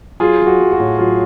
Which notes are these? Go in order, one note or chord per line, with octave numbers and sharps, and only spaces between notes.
F#3 F4 G#4
F#3
F#4
F#3
F#4
A2
F#3 F4